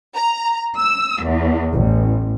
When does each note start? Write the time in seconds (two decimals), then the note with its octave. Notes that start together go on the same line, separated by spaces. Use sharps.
0.14 A#5
0.76 E6
1.24 E2
1.74 A1